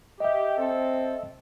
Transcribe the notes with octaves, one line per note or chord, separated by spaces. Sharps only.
G4 D#5 E5
C4 A4